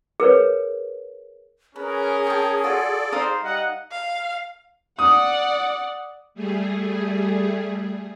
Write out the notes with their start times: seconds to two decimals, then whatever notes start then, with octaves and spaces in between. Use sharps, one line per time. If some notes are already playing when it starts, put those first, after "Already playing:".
0.20 G#4 A#4 B4 C#5
1.76 C#4 G#4 A#4 B4
2.27 G5 A5 C#6
2.64 F4 F#4 A4 D5
3.12 D#4 C5 F5 D#6
3.43 G3 D#5 F#5
3.91 F5
4.99 D5 F#5 D#6
6.34 G3 A3 G#4